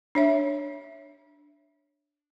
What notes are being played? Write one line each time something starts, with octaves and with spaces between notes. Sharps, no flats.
D4 C#5 E5